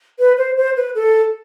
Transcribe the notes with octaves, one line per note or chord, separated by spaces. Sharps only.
B4
C5
C5
B4
A4